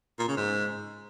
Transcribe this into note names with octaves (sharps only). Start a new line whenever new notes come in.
A#2
C#3
G#2